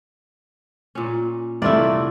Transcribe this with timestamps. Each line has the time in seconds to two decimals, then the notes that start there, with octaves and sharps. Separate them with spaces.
0.95 A#2 C#4
1.62 C2 A3 E4 F4 D5